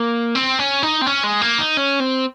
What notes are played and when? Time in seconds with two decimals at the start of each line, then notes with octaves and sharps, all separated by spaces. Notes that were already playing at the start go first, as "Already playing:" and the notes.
Already playing: A#3
0.35 C4
0.59 C#4
0.83 D#4
1.01 C4
1.06 C#4
1.23 G#3
1.41 A#3
1.59 D#4
1.77 C#4
2.00 C4